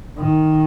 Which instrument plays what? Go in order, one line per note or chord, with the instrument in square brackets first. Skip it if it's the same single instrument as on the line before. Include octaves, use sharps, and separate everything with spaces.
[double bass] D#3